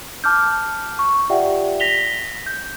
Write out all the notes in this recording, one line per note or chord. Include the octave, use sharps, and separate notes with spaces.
A5 D6 F6 G6
C#6
F4 G4 D5 E5 F#5 G5
A#6 B6 F7 G7
G6